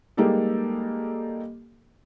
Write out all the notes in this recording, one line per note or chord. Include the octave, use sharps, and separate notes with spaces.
G3 G#3 A#3 D#4 G4 A4